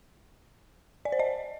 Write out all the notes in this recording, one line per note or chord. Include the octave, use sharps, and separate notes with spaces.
D5
C5
D#5